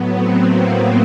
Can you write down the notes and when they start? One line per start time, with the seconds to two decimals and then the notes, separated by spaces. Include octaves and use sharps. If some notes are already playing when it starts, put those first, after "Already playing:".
Already playing: A2 F#3 B3
0.13 C4
0.47 A#3